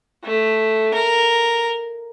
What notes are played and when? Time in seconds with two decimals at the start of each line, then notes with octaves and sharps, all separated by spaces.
0.24 A3
0.94 A#4